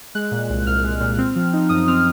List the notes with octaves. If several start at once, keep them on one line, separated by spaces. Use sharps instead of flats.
G#3 F#6
A#2
C2
C2 F6
G#3
A#2
C4
F3
D#4
F#2 D#6
C4 F6